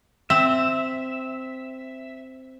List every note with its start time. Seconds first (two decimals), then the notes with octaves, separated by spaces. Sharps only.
0.30 C4 E5